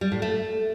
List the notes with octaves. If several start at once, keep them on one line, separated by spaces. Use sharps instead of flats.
G3
A2
A3